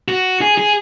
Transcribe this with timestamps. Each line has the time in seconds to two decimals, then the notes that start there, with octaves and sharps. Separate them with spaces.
0.08 F#4
0.41 G#4
0.58 G#4